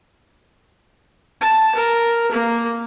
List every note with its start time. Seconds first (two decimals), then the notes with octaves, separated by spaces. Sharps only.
1.41 A5
1.75 A#4
2.32 A#3